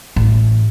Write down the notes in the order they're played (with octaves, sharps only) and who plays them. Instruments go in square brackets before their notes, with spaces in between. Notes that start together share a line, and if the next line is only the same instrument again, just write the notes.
[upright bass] A1